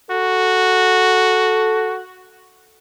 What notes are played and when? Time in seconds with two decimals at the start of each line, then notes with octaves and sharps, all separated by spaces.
0.11 F#4 A4